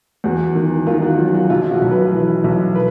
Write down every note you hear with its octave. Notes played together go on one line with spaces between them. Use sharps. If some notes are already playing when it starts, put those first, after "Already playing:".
E2 F#4
D#3
D#3 F4
F#4
F#3 F4
F#4
B1 F4
F#4
B1
B4
E3
B1
B4